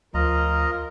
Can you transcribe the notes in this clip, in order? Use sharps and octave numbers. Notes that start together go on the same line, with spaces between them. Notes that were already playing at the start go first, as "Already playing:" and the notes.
D2 F3 F4 A#4 D#5 A#5